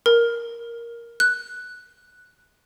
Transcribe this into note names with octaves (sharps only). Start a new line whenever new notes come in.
A#4
F#6